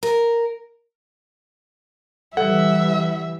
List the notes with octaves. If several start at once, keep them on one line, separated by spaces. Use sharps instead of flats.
A#4
E3 G3 A4 E5 F#5